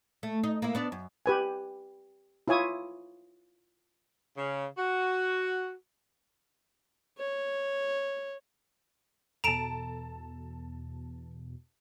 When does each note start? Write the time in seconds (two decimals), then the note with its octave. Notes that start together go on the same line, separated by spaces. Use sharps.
0.23 A3
0.44 D#4
0.62 A#3 E4
0.75 B3 D4 D5
0.92 F#2
1.26 G4 B4 G#5
2.48 E4 F4 C#5 G#5 D#6
4.37 C#3
4.78 F#4
7.18 C#5
9.44 E2 B2 A4 A5 A#5 D7 E7